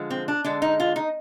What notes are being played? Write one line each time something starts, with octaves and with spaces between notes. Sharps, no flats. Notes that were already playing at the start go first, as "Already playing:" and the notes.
Already playing: D3 F3 G#3
C4
D4
D3 G#3 D4
D#4
F4
D#4